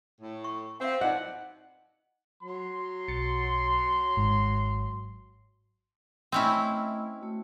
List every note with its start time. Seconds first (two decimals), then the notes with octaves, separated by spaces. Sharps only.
0.20 A2
0.44 C#6
0.80 C4 F5 F#5
1.01 D#4 F#4 B4 D5 D#5 F#5
2.43 F#3 C6
3.08 B1 A6 C#7
4.17 G#1 G#2
6.32 A3 C4 C#4 E4 D#5
7.22 A3 F#4